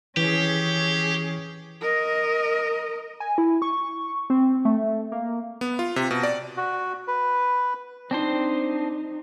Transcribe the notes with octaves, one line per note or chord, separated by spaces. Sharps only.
E3 C#4 G4 G#4
A#4 D#5
G#5
E4
C#6
C4
A3
A#3
B3
F4
C3
B2
D5
F#4
B4
C4 D4 D#4 C5